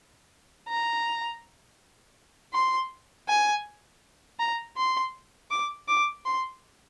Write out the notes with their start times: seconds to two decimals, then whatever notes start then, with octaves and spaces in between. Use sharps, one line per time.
0.69 A#5
2.54 C6
3.29 G#5
4.39 A#5
4.77 C6
5.50 D6
5.88 D6
6.25 C6